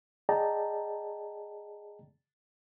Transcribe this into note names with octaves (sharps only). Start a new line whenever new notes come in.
G#4 D5 D#5 G5 A5 A#5